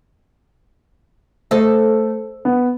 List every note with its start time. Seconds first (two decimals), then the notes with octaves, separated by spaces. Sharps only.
1.51 A3 A4 C5 D#5
2.45 B3